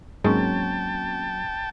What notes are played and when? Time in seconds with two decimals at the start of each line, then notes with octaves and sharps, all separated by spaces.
0.24 G#2 F#3 G#3 A#3 C4 C#4 G5 A5